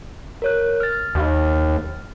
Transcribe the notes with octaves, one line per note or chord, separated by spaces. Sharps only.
A#4 C#5 F#6
F6 A6
D#2